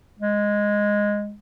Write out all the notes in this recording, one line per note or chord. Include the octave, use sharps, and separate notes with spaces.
G#3